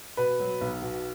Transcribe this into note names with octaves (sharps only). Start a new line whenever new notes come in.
B2 B4
F#3
B1
B2